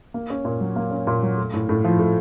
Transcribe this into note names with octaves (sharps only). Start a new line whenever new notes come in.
A#3
C#4
A#2
F#3
A#3
C#4
A#2
F#3
A3
A2
A2
F3
A3